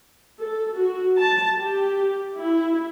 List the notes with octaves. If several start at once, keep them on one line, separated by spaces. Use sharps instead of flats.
A4
F#4
A5
G4
E4